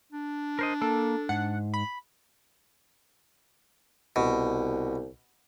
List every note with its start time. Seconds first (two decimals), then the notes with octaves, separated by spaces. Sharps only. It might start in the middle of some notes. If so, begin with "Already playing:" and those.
0.12 D4
0.59 A#4 C5 D#5
0.82 A#3 A4
1.29 G#2 F#5
1.74 B5
4.16 C2 B2